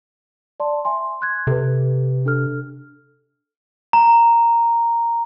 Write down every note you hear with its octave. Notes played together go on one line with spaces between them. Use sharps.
D5 A5 C6
E5 G#5 C6
C6 F#6 G#6
C3 A4 B4
D4 A4 F6
A#5